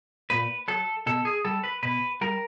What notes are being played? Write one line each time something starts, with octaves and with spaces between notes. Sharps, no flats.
A#2 B4
F#3 A4
B2 A4
G#4
G3 A4
B4
B2 B4
G3 A#4